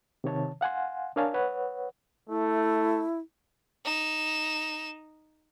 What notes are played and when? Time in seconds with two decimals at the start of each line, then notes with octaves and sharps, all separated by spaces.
0.24 C3 D#3 C#5 A5
0.61 F5 F#5 G#5 C6
1.16 D4 A#4 C#5 F5 G#5 A5
1.34 B4 C#5 F#5
2.29 A3 E4
3.85 D#4 E7